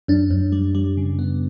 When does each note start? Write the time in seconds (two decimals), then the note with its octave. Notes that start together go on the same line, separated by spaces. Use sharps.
0.08 F#2 D4
0.31 F#2
0.52 G3
0.75 G3
0.97 C#3
1.19 B3